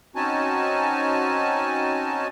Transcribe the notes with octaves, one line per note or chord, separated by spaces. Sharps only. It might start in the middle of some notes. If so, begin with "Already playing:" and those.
C4 C#4 D#4 F#4 G#5 A5